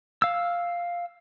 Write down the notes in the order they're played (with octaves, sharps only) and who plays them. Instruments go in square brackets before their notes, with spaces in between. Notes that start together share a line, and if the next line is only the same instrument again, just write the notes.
[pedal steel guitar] F5 E6